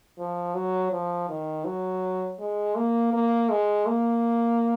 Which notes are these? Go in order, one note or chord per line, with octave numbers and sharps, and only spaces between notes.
F3
F#3
F3
D#3
F#3
G#3
A#3
A#3
G#3
A#3